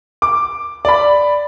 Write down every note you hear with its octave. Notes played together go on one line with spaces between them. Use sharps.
D6
D5 B5